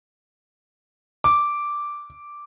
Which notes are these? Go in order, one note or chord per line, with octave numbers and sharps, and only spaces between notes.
D6